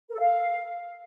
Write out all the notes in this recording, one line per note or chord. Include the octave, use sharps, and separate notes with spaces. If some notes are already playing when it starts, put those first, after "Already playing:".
A#4
A4
F5